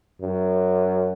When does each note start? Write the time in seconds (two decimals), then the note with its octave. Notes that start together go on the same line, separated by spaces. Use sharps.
0.21 F#2